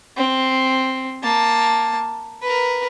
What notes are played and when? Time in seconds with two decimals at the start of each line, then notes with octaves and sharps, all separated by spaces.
0.17 C4
1.23 A#3 A5
2.42 A#4 B4